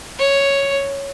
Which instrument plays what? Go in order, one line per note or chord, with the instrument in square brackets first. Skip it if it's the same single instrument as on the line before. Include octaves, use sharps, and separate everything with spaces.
[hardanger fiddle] C#5